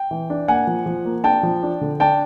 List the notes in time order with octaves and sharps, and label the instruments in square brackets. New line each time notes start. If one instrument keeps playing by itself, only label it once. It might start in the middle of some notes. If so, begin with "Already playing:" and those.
Already playing: [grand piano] G5
E3
D4
A#3 F#5 G#5
F3
F3
A#3
D4 G5 A5
F3
D4
D3
D4 G5 A5